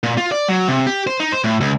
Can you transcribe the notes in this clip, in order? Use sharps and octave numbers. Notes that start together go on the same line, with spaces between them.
A#2
F4
D5
F#3
C3
G4
C5
D#4
C5
A2
C#2